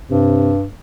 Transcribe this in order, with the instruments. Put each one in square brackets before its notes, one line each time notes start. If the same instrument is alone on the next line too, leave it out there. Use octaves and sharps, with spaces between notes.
[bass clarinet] G2 [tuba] C3